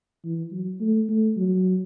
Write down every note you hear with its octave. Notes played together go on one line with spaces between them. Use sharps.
E3
F#3
A3
A3
F#3